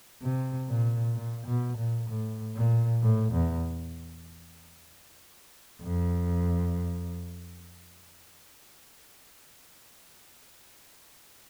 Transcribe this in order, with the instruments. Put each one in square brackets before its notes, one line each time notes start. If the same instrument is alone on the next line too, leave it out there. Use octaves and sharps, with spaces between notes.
[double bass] C3
A#2
A#2
B2
A#2
A2
A#2
A2
E2
F2